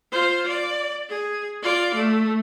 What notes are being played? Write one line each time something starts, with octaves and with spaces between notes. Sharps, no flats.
F4 C5
D5
G#4
F4 D5
A3